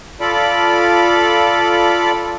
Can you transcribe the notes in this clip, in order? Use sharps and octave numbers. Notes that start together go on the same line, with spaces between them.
F4 A4 D5 B5